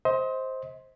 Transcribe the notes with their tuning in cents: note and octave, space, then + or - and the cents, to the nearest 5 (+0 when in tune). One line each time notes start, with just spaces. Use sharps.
C5 +5 D#5 +35